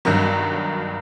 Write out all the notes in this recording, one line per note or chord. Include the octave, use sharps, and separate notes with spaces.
B1 G2 D#3 F#3